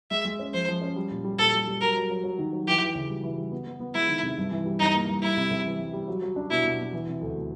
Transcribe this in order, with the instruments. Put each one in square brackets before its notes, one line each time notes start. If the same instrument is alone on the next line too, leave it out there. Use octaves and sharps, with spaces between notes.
[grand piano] G#3 [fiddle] E5
[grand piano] G#3
C#4
[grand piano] F3 [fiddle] C5
[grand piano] F3
C#4
G3
A#2
G3
[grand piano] A#2 [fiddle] A4
[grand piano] G3
G3
[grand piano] F#3 [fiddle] A#4
[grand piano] F#3
F#3
F#3
D#3
F#3
[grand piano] E3 [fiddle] G4
[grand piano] E3
C#3
G3
E3
G3
B3
B3
B3
[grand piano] G#3 [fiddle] E4
[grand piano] D#3
C3
G2
E3
G3
[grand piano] G2 [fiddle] D#4
[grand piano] A#3
G2
[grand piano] G3 [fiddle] E4
[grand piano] C3
C3
E3
G3
G3
F#3
F#3
D4
[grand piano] B2 [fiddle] E4
[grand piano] B2
B2
E3
C3
D2
A3